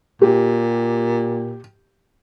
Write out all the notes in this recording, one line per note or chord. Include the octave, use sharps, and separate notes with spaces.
A#2 G4